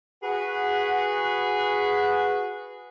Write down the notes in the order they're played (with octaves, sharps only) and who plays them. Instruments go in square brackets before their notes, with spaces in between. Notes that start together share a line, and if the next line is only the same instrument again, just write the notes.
[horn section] F#4 G#4 B4